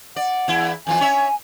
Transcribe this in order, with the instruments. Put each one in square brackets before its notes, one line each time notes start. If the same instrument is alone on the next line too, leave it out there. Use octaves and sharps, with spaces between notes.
[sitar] D5 [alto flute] F#5
[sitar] E2 E4
[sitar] F2 E3 F4 [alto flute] G#5
[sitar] C#4 C#5 E5